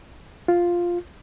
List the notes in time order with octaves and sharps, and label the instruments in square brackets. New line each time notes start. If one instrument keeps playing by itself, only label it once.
[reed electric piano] F4